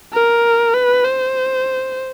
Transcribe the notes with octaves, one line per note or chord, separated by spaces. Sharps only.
A#4
B4
C5